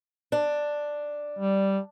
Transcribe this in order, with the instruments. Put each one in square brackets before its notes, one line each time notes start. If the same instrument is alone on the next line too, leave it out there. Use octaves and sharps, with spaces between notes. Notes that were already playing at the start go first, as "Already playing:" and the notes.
[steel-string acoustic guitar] D4
[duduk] G3